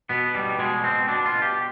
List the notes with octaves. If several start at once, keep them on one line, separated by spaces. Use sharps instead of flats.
B2 B3
G3
B2 G#3
C4
B2 D4
F4
G4